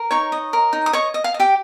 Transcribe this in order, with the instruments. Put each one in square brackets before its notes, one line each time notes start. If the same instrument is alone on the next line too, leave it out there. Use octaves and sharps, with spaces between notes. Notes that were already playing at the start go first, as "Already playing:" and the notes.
Already playing: [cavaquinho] A#4
D#4 C#5 C#6
D#5
A#4
D#4
D#6
C#5 D#5 C#6
D#5
F5
D#5
G4 G5